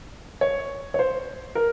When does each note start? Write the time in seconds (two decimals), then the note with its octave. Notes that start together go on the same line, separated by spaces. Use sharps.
0.41 C#5
0.94 C#5
0.99 C5
1.55 A#4